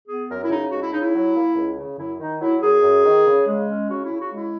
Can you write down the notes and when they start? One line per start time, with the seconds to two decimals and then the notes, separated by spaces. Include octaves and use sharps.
0.08 B3 G#4
0.29 F#2 A#4
0.43 E4
0.50 C#3 D#4
0.71 C#2 F#4
0.82 E4
0.92 C#3 D#4
1.01 E4
1.14 F#3
1.35 A#3
1.55 C#2
1.78 C#3
1.98 F#2 E4
2.19 D#3 D#4
2.40 F#3 E4
2.62 F#2 G#4
2.82 F#2
3.05 D#3
3.25 C#3
3.47 G#3
3.67 C#4
3.89 C#3 F#4
4.04 E4
4.09 C#3
4.20 F#4
4.31 G#3
4.36 E4